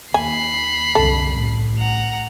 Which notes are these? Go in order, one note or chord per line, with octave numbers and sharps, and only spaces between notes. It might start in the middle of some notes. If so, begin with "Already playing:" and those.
D#2 G#5 B5 C7
C2 F#2 D3 A4
A1
F#5 A#5